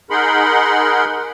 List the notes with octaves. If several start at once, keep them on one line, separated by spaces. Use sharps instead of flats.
D#4 G#4 A#4 F#5 B5 C6